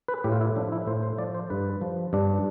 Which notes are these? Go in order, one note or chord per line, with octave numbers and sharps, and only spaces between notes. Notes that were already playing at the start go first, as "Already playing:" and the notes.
B4
A2 G4
F4
E4
F3 D4
E4
A2 C5
C5
F3 D5
C5
G2 B4
F3
G2 D4